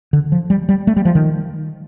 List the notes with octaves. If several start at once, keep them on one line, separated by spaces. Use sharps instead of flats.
D3
F3
G3
G3
A3
G3
F3
D#3